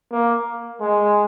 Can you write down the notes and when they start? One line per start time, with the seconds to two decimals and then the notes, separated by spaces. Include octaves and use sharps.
0.12 A#3
0.80 G#3